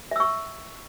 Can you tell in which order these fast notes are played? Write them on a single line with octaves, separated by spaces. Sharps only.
E5 E6 C#6